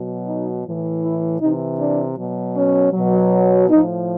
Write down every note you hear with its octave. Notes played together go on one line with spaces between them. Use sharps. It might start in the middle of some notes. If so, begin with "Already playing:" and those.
Already playing: B2 F#3
D#4
A2 E3
E4
C3 E3 D#4
D4
B2 F#3
C#4
B2 F#3
A2 F3 D#4